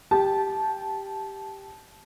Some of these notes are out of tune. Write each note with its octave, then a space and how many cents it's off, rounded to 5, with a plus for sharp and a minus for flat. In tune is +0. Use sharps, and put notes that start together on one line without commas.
G4 +0 A5 -15